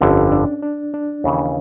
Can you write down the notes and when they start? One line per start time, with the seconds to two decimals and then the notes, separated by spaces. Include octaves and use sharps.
0.01 G1 F2 D3 C#4
0.32 D4
0.63 D4
0.94 D4
1.24 D#2 C#3 E3